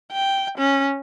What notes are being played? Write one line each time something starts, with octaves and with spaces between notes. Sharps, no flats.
G5
C#4